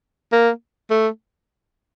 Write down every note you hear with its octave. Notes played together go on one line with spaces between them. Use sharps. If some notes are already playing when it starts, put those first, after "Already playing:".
A#3
A3